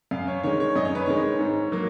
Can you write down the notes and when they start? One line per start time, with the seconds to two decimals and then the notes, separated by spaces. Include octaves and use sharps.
0.11 F#2 F5
0.28 C#5
0.43 D#3 G#3 C#5
0.60 C#5
0.76 F#2 D#5
0.85 C#5
0.95 B4
1.06 D#3 G#3 C#5
1.39 G#2
1.72 F#3 A#3